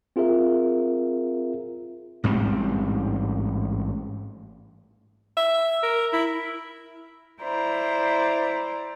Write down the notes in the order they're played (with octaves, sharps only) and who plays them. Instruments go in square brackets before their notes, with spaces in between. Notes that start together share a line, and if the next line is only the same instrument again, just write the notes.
[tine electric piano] C4 F4 G#4 A#4 E5
[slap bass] A1 G#2 G3 C4
[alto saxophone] E5
A#4
E4
[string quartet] E4 C5 D5 A#5